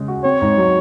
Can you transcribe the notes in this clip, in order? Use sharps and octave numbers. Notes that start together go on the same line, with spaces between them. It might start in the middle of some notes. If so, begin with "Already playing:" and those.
Already playing: C#3 G#3 C#4
F#4
C4 C#5
G#2
F#3